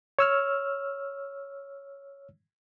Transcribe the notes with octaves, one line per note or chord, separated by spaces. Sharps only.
C#5 E6 F6